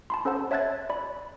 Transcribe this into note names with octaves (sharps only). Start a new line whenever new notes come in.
A5 B5 C6
C#4 A4 C5 F#5 A5
C#5 E5 A5 F#6 G#6 A6
D5 B5